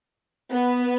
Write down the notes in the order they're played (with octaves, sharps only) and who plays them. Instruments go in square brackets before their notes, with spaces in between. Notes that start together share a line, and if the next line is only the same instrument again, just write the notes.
[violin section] B3